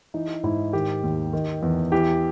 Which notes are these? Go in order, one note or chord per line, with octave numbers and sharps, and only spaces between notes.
E3 D#4
G#2 E4
D#3 G4
D#2
D#3
E2
E3 G4